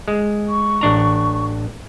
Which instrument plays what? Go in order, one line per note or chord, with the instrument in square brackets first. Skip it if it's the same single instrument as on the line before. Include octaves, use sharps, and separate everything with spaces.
[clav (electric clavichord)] G#3
[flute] C#6
[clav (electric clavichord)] A1 D4 A#5